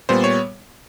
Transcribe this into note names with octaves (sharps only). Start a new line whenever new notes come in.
A#2 G3 B3 C5
C#5